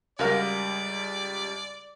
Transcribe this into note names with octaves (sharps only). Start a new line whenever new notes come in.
C#2 G3 F#4 A#4 D5 F5